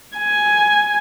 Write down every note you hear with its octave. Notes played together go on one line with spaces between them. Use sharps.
G#5